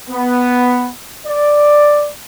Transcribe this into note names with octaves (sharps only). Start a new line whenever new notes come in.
B3
D5